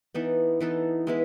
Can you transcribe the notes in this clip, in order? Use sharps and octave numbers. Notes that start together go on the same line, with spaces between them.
E3 B3 D#4 A4
E3 B3 D#4 A4
G#3 B3 E4 B4